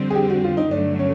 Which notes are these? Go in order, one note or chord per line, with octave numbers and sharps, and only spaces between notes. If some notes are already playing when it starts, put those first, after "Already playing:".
Already playing: F2 D3 G3 C4
G#4
G4
F#4
F4
D#4
G2 D3 F#3 A3 D4
C#4